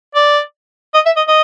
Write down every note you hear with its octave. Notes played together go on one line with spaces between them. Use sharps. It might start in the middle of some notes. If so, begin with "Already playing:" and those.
D5
D#5
E5
D#5
D#5